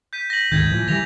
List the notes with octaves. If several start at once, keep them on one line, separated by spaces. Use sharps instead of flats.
G6 B6 D#7
A#6 B6 F#7
D2 G#2 D#3 G6 G#6 A#6
A2 E3 F3
C#3 E3 G3 A#6 F7